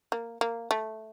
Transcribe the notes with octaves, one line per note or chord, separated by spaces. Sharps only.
A#3
A#3
A3